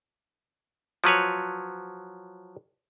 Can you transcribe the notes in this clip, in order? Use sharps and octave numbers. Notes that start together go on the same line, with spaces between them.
F3 F#3 B4 C#5